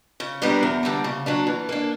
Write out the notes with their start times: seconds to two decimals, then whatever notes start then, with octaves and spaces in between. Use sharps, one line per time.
0.20 C#3
0.42 G3 B3 D4 A#4
0.63 E2
0.83 D3 G3 A#3
1.04 C#3
1.26 F#3 A#3 D4
1.47 E3
1.69 A#3 D4